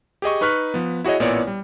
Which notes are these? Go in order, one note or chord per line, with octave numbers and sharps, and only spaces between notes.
G4 G#4 D#5 C#6
D#4 B4 C#6 F6 F#6 B6
F3 B3
E4 F#4 G#4 C#5 D#5
A1 A#2 B3 E4 C#5 D5
G3